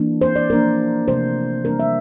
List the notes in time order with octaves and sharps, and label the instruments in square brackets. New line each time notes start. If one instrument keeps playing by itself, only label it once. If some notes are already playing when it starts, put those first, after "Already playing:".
Already playing: [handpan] E3 A#3 D4
C5
D5
F3 A#3 D4 A#4
C3 F3 A3 C5
E3 G3 A#3 D4 A#4
E5